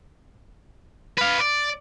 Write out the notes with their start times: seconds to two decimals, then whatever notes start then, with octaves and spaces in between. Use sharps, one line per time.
1.18 B4 F5
1.40 D5